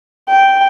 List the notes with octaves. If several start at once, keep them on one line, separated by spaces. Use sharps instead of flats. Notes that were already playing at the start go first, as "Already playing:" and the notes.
G5